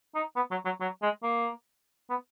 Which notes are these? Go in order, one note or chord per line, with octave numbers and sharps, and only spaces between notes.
D#4
B3
F#3
F#3
F#3
G#3
A#3
B3